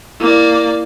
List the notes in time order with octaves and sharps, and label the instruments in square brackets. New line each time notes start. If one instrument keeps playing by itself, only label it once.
[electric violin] A#3 D5 [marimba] E4